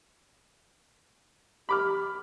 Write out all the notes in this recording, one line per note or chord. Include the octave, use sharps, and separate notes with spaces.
G4 B5 D6 F6